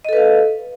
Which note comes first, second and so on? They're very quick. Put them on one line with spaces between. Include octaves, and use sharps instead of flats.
D#5 A4 B4 F5